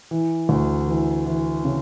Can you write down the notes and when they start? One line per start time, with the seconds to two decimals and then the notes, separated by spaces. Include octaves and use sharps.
0.11 E3
0.49 D2
0.88 E3
1.26 E3
1.64 C#3